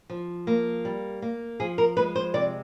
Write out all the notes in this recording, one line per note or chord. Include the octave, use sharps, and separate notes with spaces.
F3
A#3
G3
A#3
F3 G#4
A#4
G#3 B4
C5
C3 D5